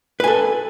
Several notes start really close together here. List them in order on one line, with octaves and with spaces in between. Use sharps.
B4 G#5 A4